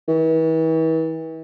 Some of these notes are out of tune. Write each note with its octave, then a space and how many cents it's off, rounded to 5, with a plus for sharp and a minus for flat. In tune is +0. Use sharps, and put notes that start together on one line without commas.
E3 -40